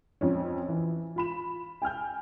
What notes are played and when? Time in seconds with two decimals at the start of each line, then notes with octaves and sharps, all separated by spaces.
0.21 F2 C#4
0.68 E3
1.16 F4 B5 E7
1.82 G5 G#5 F6 G6